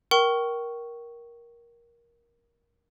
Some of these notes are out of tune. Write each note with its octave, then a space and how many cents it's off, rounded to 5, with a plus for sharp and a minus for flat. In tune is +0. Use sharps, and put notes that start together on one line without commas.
A#4 +15 G5 -30 C#6 +0